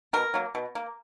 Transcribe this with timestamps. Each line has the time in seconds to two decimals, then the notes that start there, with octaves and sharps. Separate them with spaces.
0.13 B2 A#4
0.34 F#3 A#3
0.55 B2
0.75 A#3